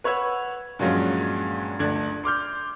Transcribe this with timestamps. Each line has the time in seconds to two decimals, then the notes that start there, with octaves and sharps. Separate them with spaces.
0.04 B4 C#5 F#5 E6 G#6
0.79 G2 A#2 F3 F#3 G#3 C#4
1.79 G1 D2 D4 G#6
2.24 C6 D6 F6 G6